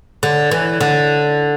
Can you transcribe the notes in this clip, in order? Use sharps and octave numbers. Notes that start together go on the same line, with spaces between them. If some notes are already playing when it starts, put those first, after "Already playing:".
D3
E3
D3